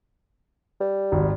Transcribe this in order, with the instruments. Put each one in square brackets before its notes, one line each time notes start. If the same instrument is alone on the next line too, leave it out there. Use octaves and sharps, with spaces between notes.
[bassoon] G3
[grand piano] G#1